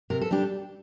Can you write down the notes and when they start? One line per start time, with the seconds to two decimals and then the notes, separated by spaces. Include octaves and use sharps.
0.10 C3 A#4
0.21 A4
0.31 G3 D4 G4